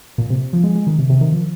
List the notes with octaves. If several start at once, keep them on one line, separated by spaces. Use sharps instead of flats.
A#2
C3
F3
G#3
G#3
D#3
C3
C3
D#3
F3